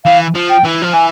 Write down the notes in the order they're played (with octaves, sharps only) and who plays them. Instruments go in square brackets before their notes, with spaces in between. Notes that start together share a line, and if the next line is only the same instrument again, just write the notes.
[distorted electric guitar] E3 [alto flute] F5
[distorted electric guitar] F3
[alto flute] G5
[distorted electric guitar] E3
F3
[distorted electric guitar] E3 [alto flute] G#5